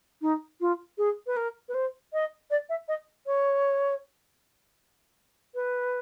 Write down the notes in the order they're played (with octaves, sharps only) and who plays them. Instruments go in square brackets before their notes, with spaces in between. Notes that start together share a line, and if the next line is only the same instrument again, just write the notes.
[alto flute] D#4
F4
G#4
B4
A#4
B4
C5
D#5
D5
E5
D#5
C#5
B4